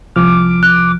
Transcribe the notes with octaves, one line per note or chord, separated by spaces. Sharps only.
C2 F3 D6 F6
F#6